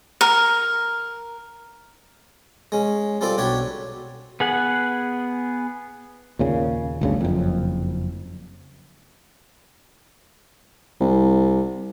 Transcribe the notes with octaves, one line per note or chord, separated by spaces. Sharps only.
A#4
G#3 C#4
G3 C4 F4 A4 D5
B1 D4 G4 C#5
B3 G#4 F#5
D#2 A#2 C#3
G1 D2 C#3
F#1 F2
C2